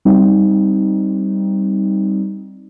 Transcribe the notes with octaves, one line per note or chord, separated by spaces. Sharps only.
G3 C4 D#4